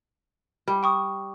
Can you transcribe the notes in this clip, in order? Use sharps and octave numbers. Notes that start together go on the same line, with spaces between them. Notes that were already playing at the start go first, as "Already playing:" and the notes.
G3
G5 C#6 D#6